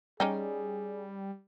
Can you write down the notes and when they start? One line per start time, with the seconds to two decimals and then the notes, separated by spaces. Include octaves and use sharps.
0.20 G3 C#4 D#4 G4 G#4